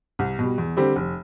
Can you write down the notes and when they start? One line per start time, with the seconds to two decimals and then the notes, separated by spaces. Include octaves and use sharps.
0.19 C2
0.39 B2 G3
0.58 E2
0.77 D3 G3 C4 G4
0.96 F1